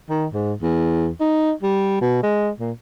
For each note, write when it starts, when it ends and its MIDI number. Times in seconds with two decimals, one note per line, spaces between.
0.10 0.26 51
0.33 0.53 44
0.62 1.08 40
1.20 1.51 63
1.62 1.99 55
2.01 2.21 47
2.23 2.50 56
2.60 2.72 46